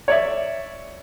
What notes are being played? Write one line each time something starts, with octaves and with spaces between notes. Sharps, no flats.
C#5 D5 E5